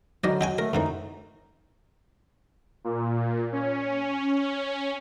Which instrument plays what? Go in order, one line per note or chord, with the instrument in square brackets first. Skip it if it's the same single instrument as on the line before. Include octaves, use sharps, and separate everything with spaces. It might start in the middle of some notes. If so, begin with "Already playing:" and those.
[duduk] D3 [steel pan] F#3 D#4 [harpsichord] D5 D#5
[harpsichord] D#4 G5 G#5 [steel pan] F#4
[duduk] A3 [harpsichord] A#4
[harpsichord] F#2 A2 E3 [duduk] D#4
[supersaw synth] A#2
C#4